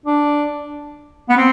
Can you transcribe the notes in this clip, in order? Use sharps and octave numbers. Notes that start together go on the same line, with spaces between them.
D4
B3
C4